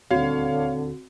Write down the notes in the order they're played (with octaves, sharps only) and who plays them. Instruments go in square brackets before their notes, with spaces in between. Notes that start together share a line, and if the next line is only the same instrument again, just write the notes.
[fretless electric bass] D#1 D2 [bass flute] D3 [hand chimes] C4 F#4 [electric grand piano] C#5 F5